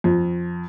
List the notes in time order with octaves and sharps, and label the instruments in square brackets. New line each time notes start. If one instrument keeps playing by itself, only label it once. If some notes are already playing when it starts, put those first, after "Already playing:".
[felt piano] F2